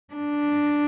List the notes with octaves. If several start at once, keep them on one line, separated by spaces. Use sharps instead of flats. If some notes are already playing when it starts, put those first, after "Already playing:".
D4